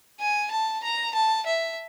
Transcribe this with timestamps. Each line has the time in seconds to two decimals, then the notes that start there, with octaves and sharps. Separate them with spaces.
0.20 G#5
0.51 A5
0.84 A#5
1.15 A5
1.46 E5